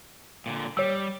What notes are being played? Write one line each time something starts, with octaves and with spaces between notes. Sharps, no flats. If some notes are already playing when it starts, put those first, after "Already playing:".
A#2 D3
G3 C#5 E6